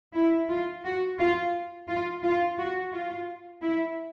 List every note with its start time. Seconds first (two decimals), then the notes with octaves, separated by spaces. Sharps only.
0.14 E4
0.49 F4
0.84 F#4
1.18 F4
1.88 F4
2.23 F4
2.58 F#4
2.92 F4
3.62 E4